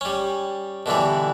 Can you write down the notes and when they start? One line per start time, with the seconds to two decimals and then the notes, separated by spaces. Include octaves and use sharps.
0.01 G3 C#4
0.86 B2 D3 E3 G3